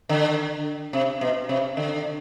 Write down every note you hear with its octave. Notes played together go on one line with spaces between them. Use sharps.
D3
C3
B2
C3
D3